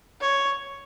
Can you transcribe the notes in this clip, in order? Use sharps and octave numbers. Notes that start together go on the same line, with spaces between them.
C#5